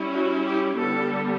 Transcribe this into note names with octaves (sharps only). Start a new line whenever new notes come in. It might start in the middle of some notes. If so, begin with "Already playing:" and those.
Already playing: G3 C#4 E4
F#4
G4
D3 G3 B3 A4